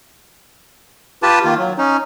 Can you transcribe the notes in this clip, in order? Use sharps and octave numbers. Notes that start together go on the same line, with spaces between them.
F4 G4 B4 A5
D#3 A#3 F4
F#3
C#4 D#4